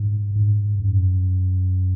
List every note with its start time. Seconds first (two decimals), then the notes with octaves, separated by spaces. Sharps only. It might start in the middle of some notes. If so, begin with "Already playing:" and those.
Already playing: G#2
0.36 G#2
0.80 F#2